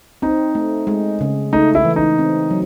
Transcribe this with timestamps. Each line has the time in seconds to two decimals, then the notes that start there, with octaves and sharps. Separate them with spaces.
0.22 C4 D#4
0.55 A3
0.87 G#3
1.21 C#3
1.53 A3 D#4
1.75 E4
1.85 E3
1.96 D#4
2.18 C4
2.51 F#3